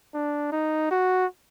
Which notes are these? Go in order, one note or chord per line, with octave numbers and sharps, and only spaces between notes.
D4
D#4
F#4